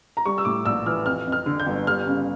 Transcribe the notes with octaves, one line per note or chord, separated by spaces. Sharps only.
A#5
G3 C#6
E6
A2 D6
A#1 E6
E3 F6
F2 F6
F2
F6
D3
G6
G1
G3 F6
C#3